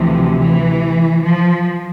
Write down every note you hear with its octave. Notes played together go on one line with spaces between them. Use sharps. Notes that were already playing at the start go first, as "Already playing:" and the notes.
Already playing: D2 C3 E3 F3
E3
F3